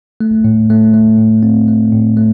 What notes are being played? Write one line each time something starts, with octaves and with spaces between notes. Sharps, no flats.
A3
A2
A3
A3
A2
C4
A3
A2
A3